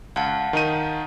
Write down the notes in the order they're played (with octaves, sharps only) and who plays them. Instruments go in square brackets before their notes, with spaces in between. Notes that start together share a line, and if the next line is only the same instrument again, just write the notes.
[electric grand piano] C#2 [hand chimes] F5 F#5 A5
[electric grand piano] D#3 D#4 D#7